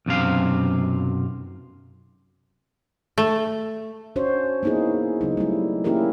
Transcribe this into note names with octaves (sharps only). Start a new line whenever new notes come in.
B1 F#2 C3 F5
A3
C#4 D4 F#4 C5 C#5
A#3 B3 D#4 E4 G#4
C#3 F#3 D#4
G3 A3 E4
A#3 C#4 E4 G4 G#4 A#4